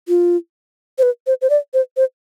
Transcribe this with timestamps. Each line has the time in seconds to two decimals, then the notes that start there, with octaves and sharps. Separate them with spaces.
0.08 F4
0.98 C5
1.03 B4
1.27 C5
1.42 C5
1.50 D5
1.74 C5
1.97 C5